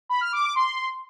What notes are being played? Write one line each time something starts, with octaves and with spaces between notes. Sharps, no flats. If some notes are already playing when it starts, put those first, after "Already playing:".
B5
F6
D6
D6
C6